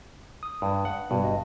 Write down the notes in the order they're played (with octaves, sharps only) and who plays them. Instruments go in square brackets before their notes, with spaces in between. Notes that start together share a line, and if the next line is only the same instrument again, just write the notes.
[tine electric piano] D#6
[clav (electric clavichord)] G2
F#5
[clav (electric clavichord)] G2 [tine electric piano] B2 G3
[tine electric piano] G1 D#5